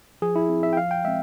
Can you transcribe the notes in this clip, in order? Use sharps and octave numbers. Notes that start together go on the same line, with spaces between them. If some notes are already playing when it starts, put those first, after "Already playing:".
F3 G#4
E4
C4
E5
G5
F3 F5
G5
G#3 C4 E5